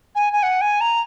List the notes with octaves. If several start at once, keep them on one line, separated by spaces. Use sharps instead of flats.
G#5
G#5
F#5
G#5
A#5